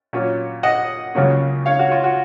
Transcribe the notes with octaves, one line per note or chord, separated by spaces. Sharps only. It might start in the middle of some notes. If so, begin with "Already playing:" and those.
A#2 F#3 C#4
D#5 F#5
C#2 C#3 F#3 A#3 C#4
C#5 F5
F#4
F4
F#4